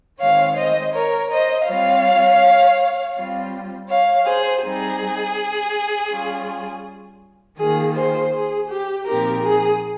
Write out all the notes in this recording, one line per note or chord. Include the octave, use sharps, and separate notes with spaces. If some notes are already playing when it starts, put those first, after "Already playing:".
D#3 G#3 C4 C#5 F5
C5 D#5
A#4 C#5
C5 D#5
G3 C4 F4 C#5 F5
G3 C4 F4
C#5 F5
G#4 C5
G3 C4 D#4 G#4
G3 C#4 F4
D#3 A#3 F4 G#4
G#4 C5
G#4
G4
A#2 F3 C4 D#4 G4 A#4
G#4